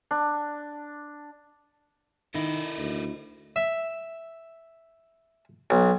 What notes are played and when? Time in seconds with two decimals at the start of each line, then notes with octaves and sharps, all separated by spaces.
0.11 D4
2.35 D#3 D#4 E4 A4 A#4 D#5
2.78 D2
3.56 E5
5.70 B1